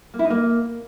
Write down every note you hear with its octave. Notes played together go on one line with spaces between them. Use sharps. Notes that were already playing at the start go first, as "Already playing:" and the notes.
A#3
E4
D#4
A#3